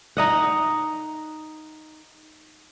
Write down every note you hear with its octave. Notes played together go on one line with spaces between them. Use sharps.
D#4 D#5 F#5